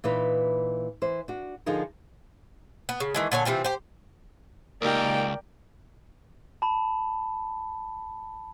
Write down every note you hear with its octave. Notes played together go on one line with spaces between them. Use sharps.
A#2 E3 D#4 B4
E3 C5
D4 F#4
D3 F3 D#4 G#4 A#4
B3
C#3
D#3 E3 G#3
A#2 D3 C#5 G#5
C3 E3 C4 F4
G4 C5
C#2 A#3 D#4 G4 A#4 D5 G5
A5 B5